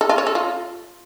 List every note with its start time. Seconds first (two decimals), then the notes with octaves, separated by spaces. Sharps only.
0.01 A4
0.09 F4
0.18 C#5
0.27 A4
0.35 F4